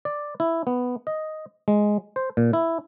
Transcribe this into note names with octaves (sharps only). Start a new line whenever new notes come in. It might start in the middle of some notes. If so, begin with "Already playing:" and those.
D5
E4
B3
D#5
G#3
C5
A#2
E4